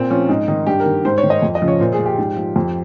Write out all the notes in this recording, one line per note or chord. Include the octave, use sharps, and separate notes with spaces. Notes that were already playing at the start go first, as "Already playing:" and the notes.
Already playing: A#2 C4
F3 C#4
G#2 D#4
D#3 D#4
G2 G4
A#4
D#3
G#2 C5
C#5
D#3
D#5
F2
D#5
C#3 F3
C#5
A#2 C5
G#4
F3
G4
G#2
F3
F2